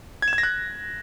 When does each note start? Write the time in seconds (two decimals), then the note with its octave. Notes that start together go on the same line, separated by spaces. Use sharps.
0.22 G#6
0.28 E7
0.33 G#6
0.38 A#6
0.43 F#6